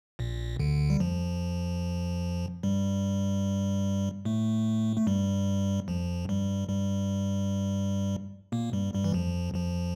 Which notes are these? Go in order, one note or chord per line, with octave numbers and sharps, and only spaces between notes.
A#1 A#2
D2 D3
G3
F2 F3
G2 G3
A2 A3
A3
G2 G3
F2 F3
G2 G3
G2 G3
A#2 A#3
G2 G3
G2 G3
E3
F2 F3
F2 F3